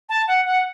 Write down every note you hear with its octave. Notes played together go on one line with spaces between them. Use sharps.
A5
F#5
F#5